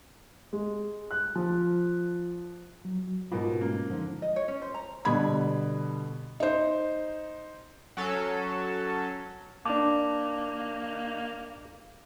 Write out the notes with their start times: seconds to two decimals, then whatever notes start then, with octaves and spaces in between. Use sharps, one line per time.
0.53 G#3
1.11 F#6
1.36 F3
2.85 F#3
3.32 G#2 B2 F4 A#4
3.61 G#3 A#3 C#4
3.90 D3 F3 D#4
4.22 D#5
4.36 C#5
4.48 C#4
4.62 C5
4.74 A#5
5.05 B2 D3 G3 B5 G#6
6.40 D#4 C5
7.97 F#3 C#4 A4
9.66 A#3 D4 A5 D6